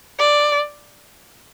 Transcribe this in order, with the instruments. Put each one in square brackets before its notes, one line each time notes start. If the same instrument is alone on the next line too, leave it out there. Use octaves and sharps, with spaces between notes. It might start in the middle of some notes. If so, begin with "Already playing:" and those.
[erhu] D5